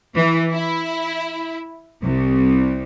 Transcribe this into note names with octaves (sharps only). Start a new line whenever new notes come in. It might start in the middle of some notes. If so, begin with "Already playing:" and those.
E3
E4
C2